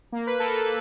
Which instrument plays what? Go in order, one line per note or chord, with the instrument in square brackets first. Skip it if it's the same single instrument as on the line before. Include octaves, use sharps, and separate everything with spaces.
[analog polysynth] A#3
B4
A#3 A4